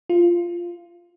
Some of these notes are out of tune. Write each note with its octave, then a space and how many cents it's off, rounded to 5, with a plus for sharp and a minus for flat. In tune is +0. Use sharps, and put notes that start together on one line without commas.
F4 -10